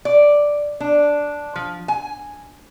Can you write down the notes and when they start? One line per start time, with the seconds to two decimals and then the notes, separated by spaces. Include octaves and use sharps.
0.05 D5
0.80 D4
1.56 F3
1.88 G#5